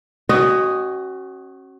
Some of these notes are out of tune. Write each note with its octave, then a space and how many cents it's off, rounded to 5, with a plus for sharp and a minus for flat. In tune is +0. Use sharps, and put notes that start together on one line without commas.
C#4 -35 F#4 +25 D#5 +0